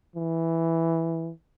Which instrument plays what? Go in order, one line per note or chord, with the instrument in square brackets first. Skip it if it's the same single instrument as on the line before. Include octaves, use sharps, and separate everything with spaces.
[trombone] E3